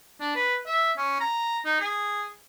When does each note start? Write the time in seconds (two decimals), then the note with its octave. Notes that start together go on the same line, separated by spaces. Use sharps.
0.20 D4
0.35 B4
0.66 E5
0.97 C#4
1.20 A#5
1.65 D#4
1.80 G#4